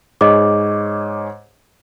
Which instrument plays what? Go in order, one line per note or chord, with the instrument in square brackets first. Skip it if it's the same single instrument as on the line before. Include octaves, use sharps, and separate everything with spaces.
[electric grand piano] G#2 G#4 C#5 [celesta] D#5 D6